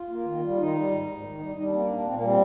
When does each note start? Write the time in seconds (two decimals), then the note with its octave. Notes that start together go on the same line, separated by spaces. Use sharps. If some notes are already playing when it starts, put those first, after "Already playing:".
Already playing: F4
0.09 A#3
0.25 D#3
0.42 G3
0.58 D#3 D#4
0.74 G3
0.91 G#2
1.06 G#2
1.23 D#3
1.39 G3
1.55 G3 D#4
1.64 D4
1.72 A#3 C4
1.80 D4
1.88 A#2
2.04 A#2 C4
2.14 A#3
2.20 G3 C4